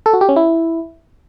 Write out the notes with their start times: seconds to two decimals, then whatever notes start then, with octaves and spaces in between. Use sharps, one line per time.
0.06 A4
0.13 F#4
0.21 G4
0.29 C#4
0.36 E4